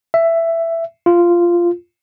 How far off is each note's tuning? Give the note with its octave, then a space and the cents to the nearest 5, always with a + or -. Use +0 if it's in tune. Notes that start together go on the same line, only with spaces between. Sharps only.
E5 +10
F4 -10